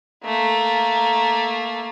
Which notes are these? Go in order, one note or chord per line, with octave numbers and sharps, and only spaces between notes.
A3 A#3